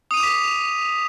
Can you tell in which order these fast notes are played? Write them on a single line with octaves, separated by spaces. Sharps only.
D#6 D#7 F7 D6 B6